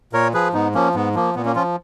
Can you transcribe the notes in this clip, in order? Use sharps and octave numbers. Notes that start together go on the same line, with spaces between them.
A#2 A#4 C#5
F3 G#4 B4
G#2 B3 D#4
F3 A#3 C#4
G#2 B3
F3 A#3
A#2 B3
A#3 C#4
F3 C#4 F4